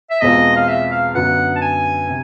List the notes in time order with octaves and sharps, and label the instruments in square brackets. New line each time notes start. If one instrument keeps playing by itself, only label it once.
[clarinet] E5
[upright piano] E2 B2 G#3 C4 F4 [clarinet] D#5
[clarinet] F5
E5
F5
[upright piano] F#2 D3 F#3 B3 [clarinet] F#5
[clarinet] A5
G#5
[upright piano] C3